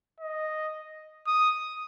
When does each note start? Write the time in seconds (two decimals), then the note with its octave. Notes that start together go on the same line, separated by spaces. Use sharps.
0.20 D#5
1.27 D#6